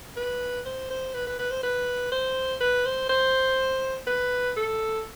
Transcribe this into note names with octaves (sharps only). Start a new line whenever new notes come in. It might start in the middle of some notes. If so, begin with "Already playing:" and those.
B4
C5
C5
B4
B4
B4
C5
B4
C5
B4
C5
C5
B4
A4